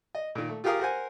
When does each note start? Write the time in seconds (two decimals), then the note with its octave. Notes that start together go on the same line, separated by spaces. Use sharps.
0.15 D#5
0.35 A#2 D#3
0.49 A3
0.64 F4 G4 G#4 A#4 F5 D#6
0.80 A#4 C5 F#5 G#5